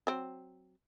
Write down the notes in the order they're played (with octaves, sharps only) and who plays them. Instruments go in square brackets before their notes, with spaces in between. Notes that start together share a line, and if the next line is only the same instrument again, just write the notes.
[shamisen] F#3 C4